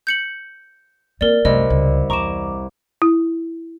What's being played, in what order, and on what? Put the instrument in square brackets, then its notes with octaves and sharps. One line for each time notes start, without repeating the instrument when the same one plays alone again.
[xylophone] G6 C#7 F#7
[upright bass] A#3 C4 [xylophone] A#4 D5
[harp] C2 [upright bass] F#2 A3 [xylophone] D#5
[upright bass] C#2
[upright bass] E2 [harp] A#5 D6 [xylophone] C#6 E7
[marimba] E4